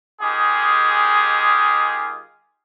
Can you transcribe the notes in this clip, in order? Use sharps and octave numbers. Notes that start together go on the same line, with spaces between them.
D#3 G#3 F4 G4 G#4